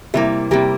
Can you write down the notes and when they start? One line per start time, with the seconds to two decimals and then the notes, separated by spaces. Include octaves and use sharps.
0.14 C3 G3 A#3 E4
0.51 C3 G3 A#3 G4